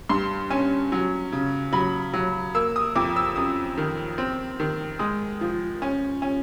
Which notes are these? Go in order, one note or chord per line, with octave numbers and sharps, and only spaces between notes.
G2 C6
C#4
F#3
C#3
F#3 B5
F#3
A#3 E6
D#6
F2 D6
E6
F#2 D#6
D#3
C4
D#3
G#3 D#6
F3
C#4
C#4